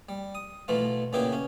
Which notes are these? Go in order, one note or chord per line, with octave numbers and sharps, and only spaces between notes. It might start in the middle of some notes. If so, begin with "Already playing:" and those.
G3
D#6
B2 E3 A3 F4
A#2 C#3 B3 E4 G4 D6
C#4